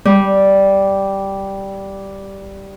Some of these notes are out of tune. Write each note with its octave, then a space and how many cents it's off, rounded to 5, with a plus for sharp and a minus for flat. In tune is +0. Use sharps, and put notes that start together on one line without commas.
G3 -5